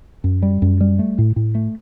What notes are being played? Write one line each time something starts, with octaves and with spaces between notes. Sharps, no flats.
F#2
G3
F#2
G3
A3
A2
A2
A3